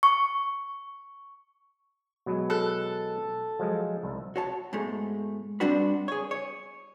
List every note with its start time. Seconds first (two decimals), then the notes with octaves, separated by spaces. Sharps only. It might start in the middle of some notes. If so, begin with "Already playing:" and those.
0.03 C#6
2.26 B2 F#3 G#3
2.50 A4 F#6
3.59 F3 F#3 G#3
4.03 C2 E5
4.36 F#4 C#5 A5
4.73 G#2 B2 G#3 A3
5.60 G3 C4 D4 F#4 B4
6.08 G#4 C#5
6.31 C#5